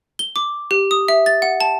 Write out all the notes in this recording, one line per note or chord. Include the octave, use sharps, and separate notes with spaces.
G7
D6
G4
D#6
E5
A6
F#5
A5